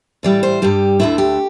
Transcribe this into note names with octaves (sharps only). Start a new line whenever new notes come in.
A2 E3 G3 D5
C5
G2 G3 G4
D2 D3 A3 E4
G4